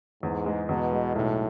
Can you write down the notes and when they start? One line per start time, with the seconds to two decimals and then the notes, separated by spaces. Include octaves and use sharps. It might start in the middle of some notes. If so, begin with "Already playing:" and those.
0.22 E2 G#2
0.46 G#3
0.69 E2 B2
0.92 G#3
1.15 B1 A2